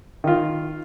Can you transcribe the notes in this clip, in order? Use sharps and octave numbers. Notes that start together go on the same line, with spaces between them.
D#3 F4